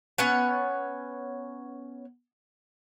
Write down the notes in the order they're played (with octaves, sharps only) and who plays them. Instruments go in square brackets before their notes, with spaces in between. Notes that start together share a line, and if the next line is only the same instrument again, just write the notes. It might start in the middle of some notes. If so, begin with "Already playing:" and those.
[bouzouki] B3 C#4 C#5 F#5